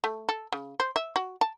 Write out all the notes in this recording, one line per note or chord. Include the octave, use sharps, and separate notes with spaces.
A3
A4
C#3
C5
E5
F#4
A5